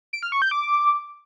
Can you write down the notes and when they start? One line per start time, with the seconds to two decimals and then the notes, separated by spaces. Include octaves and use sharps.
0.13 D7
0.23 F6
0.32 C#6
0.42 G6
0.51 D6